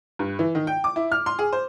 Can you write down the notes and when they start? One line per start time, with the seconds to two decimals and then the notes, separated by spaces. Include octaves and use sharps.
0.19 G2
0.39 E3
0.55 D#3
0.67 G5
0.84 D6
0.96 E4
1.12 F6
1.26 C6
1.39 G#4
1.53 C5